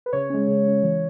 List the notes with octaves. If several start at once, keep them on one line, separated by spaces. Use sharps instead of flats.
B4
C#3 C#5
G#3 C#4
C#3
G#3 C#4
E3